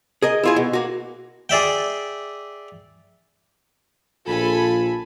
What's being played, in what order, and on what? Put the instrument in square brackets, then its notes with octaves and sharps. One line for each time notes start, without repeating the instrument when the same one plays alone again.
[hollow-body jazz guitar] G#4 A#4 D#5
E4 F4 G#4
B2
A#3 F#4
[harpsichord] G#4 D5 E5 G5
[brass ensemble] A#1 F4 [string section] A4 G#5 B5